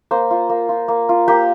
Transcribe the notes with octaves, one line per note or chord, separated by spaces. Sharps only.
A#3 C5
F4
A#3
F4
A#3
F4
A#3 G4